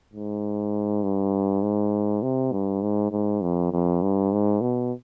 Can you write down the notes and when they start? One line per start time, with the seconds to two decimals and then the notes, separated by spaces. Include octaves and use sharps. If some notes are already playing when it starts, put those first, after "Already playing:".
0.13 G#2
1.03 G2
1.62 G#2
2.22 C3
2.52 G2
2.82 G#2
3.12 G#2
3.42 F2
3.72 F2
4.02 G2
4.32 G#2
4.61 B2